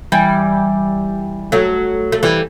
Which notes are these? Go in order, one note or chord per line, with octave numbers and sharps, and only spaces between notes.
E3 G3
F#3 A3
A3
E3 G3